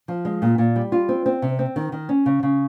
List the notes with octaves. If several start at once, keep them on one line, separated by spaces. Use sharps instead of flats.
F3
G#3
A#2
A#2
G3
F4
C4
C4
C3
C4
D#3
D#3
C#4
C#3
C#3